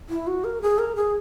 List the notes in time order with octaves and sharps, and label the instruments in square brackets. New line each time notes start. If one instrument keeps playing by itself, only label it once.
[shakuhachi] E4
F#4
A#4
G#4
A#4
G#4